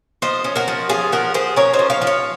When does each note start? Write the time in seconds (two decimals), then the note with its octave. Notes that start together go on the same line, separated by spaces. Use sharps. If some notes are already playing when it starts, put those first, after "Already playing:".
0.22 F3 C5 D#5
0.44 C#4
0.56 F#4 A#4
0.68 F3
0.89 C#4 F4 G#4
1.12 F3 F#4 A#4
1.34 F3 G#4 C5
1.56 C#4 A#4 C#5
1.73 C5 D#5
1.79 F3
1.90 C#5 F5
2.02 F3
2.07 C#5 F5